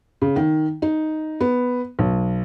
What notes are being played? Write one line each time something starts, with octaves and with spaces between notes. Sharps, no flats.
C#3
D#3
D#4
B3
B1